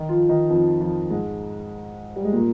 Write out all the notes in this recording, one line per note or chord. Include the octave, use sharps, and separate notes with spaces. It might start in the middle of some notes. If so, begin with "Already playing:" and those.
Already playing: D#3 D#4
F3 F4
D#3 D#4
F2 F3
F2 F3
G#2 G#3
G3
G#3
A#2 A#3